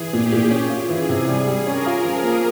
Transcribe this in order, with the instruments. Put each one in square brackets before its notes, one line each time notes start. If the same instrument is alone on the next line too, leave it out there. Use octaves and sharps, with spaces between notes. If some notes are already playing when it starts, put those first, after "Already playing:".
Already playing: [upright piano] E3 [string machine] G#4
[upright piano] A#2 [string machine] G4
[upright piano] A#2
C#4
F4
[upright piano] E3 [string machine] G#4
[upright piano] C3
G3
G3
[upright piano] C#4 [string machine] A#4
[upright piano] F4
F3
A#3